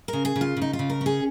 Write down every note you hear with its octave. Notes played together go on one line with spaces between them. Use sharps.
C#3 A#4
G#4
C#3
F4
C#3 D#4
F4
C#3
A#4
C#4
G#4